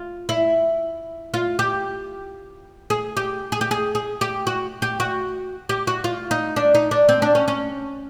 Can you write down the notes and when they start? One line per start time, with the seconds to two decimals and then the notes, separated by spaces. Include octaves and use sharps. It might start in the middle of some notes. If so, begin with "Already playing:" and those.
Already playing: F4
0.29 E4
1.34 F4
1.59 G4
2.90 G#4
3.17 G4
3.52 G#4
3.61 G4
3.71 G#4
3.95 G#4
4.21 G4
4.47 F#4
4.82 G4
5.00 F#4
5.69 G4
5.87 F#4
6.04 F4
6.31 D#4
6.56 D4
6.75 D#4
6.91 D4
7.09 C4
7.22 D4
7.35 C#4
7.48 C#4